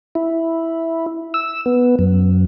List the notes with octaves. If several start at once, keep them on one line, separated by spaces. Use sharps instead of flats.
E4
E6
B3
F#2